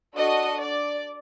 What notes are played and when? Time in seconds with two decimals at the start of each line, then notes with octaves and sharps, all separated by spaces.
0.16 D4 F#4 A4 D#5
0.60 D5